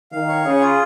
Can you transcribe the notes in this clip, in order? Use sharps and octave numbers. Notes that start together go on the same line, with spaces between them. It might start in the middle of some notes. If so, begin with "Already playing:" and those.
D#3 F5
C#5
C#3 G#4
F4